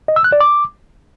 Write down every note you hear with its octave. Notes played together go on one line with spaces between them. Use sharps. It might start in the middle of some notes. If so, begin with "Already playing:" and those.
D#5
E6
F#6
D5
D6